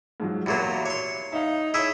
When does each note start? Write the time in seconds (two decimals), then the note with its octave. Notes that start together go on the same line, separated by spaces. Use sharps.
0.20 G#2 F3 F#3
0.46 E2 A#2 F#3 A#3 E4 G4
0.86 C#5 C6
1.32 D#4 E5 F5
1.74 E4 G#4 C#5 E5 E6